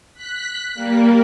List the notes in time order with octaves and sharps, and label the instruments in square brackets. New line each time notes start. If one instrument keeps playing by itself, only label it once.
[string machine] F#6 B6
G3 A#3